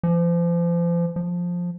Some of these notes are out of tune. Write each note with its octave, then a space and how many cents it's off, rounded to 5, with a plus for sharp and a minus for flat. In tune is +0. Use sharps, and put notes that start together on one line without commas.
F3 -35
F3 +10